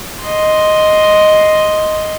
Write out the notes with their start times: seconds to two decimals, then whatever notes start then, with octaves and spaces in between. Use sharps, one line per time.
0.22 D#5 C6